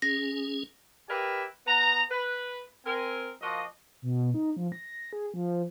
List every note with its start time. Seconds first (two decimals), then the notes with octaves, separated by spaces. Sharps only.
0.02 C#4 G#4 A#6
1.09 G4 A#4 B4 D5 E5 G#5
1.67 B3 A#5
2.10 B4
2.85 C4 A#4 G#5
3.42 F3 A#3 F#4 D#5
4.02 B2
4.34 D#4
4.57 F3
4.72 A#6
5.13 G#4
5.34 F3